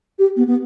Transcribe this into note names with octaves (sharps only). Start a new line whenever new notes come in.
G4
B3
B3